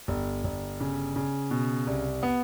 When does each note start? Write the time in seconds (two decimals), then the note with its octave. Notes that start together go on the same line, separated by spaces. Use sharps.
0.08 G1
0.44 G1
0.80 C#3
1.16 C#3
1.51 B2
1.87 C2
2.23 B3